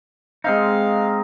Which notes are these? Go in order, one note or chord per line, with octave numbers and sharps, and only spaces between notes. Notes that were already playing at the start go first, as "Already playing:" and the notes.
G#3 C4 D#4 F5